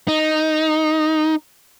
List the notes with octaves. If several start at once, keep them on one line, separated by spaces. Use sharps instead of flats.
D#4